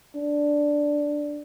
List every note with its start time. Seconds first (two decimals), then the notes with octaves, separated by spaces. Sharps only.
0.16 D4